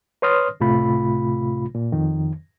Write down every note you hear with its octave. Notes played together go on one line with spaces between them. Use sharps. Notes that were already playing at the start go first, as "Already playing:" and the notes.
B4 C#5 C6 D#6 F6
C#2 A2 C3 A3 F4 B5
A#2
F2 D#3